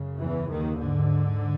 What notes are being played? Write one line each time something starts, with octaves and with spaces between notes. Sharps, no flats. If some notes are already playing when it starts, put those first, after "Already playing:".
Already playing: F#2 C#3
E2 E3
D#2 D#3
G#2 D3